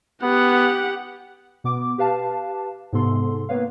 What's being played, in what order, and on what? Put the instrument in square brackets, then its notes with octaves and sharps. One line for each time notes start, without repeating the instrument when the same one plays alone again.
[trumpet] B3 [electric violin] G4 F#5
[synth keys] B2 B3 D6
G4 B4 F5 A5
G#2 C3 B3 A4 C6
A#3 B3 B4 C#5 F5